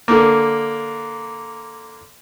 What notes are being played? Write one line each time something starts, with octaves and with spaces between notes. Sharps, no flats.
D3 A#3